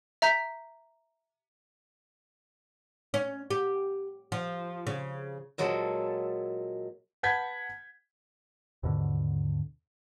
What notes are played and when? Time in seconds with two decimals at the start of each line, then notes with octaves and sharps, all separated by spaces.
0.22 E5 A#5 G6 B6
3.14 C#4
3.51 G4
4.32 F3
4.87 C#3
5.58 A#2 F#3 G#3 A4
7.23 B4 F#5 A5 G6 G#6 B6
8.83 D#2 G#2 B2 D3